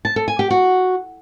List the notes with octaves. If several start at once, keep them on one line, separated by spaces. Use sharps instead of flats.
A5
A4
G#5
G4
F#4